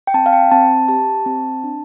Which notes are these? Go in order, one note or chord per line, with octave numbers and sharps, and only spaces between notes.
G5
C4 A5
F5
G5
C4 A5
G4 A5
C4
D4